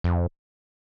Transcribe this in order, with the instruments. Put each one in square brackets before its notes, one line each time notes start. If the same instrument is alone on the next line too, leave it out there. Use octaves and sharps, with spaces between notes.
[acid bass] F2